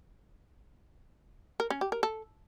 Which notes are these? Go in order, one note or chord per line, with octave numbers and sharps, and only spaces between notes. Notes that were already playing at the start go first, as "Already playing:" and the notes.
A#4
C#4
G4
A#4
A4